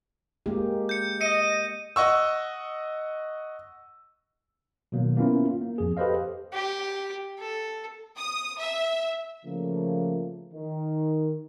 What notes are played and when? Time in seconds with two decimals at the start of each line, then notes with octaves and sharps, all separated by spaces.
0.46 G#3 A#3 G4
0.89 G6 C#7
1.21 D#5 C#7 D#7
1.96 D#5 F#5 C#6 E6
4.92 B2 D#3 F#3 A#3
5.17 A#3 B3 C#4 E4 F4
5.61 A#3
5.78 F2 G#4
5.97 G4 A4 B4 C5 D#5 F5
6.53 G4
7.40 A4
8.18 D#6
8.59 E5
9.45 C#3 F3 A3 A#3
10.52 D#3